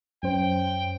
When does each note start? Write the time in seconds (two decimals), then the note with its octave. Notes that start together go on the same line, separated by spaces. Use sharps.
0.23 F#2 C#4 C5 G5